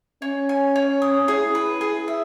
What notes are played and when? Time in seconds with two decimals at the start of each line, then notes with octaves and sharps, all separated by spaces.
0.22 C#4 C#5
0.49 G#5
0.76 C#5
1.02 D#6
1.28 E4 G#4
1.55 B4
1.81 G#4
2.08 E5